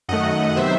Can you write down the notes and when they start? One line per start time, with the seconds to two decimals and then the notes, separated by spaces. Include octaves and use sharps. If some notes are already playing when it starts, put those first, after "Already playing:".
0.09 F#2 D#3 A3 D#5 F#5
0.56 C3 D#3 F#3 B3 C5 E5